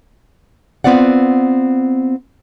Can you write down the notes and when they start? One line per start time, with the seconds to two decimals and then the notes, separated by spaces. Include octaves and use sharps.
0.84 B3 C4 F4 D5 F#5